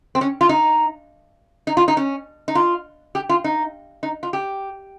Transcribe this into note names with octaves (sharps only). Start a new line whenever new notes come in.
C4
C#4
F4
D#4
D#4
F4
D#4
C#4
D#4
F4
G4
F4
D#4
D#4
F4
G4